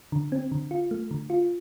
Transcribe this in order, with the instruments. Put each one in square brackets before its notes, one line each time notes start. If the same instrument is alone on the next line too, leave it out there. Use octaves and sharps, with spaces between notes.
[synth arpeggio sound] D3
C4
D3
F4
A3
D3
F4